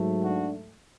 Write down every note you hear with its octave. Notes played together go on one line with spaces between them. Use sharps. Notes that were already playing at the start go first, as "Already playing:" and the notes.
Already playing: G#2 F#3 A3
D4 F#4